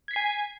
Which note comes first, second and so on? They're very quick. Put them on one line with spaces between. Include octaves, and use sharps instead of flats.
G#6 B6 C7 G#5